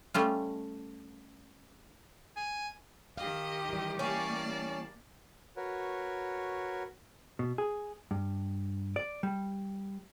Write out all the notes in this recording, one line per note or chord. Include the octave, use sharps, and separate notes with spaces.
G3 A3 C#4 F4
G#5
D#3 G4 D#5 F5
E3 G3
A#3 C#4 D5 A5
F#4 A#4 B4 C#5
B2
G#4
G2
D5
G3